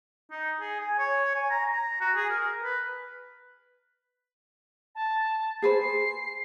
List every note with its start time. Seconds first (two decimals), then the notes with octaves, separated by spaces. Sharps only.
0.31 D#4
0.60 G#4
0.80 G#5
0.99 C#5
1.35 G#5
1.50 A#5
1.72 A#5
2.01 F#4
2.16 G#4
2.29 A#4
2.63 B4
4.95 A5
5.62 G#4 B4 C5 C7